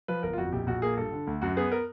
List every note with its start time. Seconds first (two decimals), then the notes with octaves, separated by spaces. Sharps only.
0.08 F3 B4
0.23 G1 A#4
0.33 F4
0.38 F2 F#4
0.52 A#1 G4
0.67 A#1 F#4
0.82 A#3 G#4
0.97 G2 A4
1.12 D3
1.27 D2
1.42 F#2 F#4
1.57 B3 G#4
1.72 A#4